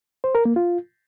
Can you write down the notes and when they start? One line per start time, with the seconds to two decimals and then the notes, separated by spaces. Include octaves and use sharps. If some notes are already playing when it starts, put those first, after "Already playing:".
0.24 C5
0.35 A#4
0.45 A#3
0.56 F4